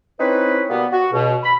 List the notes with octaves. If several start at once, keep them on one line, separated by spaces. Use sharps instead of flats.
C4 C#4 D#4 E4 B4
B2 G3 A#3 B3
F#4
C#2 B2
B5